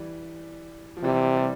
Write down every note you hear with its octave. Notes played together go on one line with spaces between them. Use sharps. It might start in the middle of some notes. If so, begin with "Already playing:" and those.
Already playing: E3 G3
F3
C3 E3 G3
G3